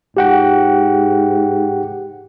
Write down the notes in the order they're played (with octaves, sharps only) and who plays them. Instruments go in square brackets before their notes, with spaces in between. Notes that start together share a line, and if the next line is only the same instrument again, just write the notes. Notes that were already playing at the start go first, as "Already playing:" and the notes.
[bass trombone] G#2 [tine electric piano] G4 F#5 G5